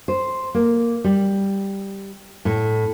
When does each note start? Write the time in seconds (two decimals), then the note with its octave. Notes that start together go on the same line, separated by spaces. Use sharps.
0.08 C5
0.55 A#3
1.04 G3
2.45 A2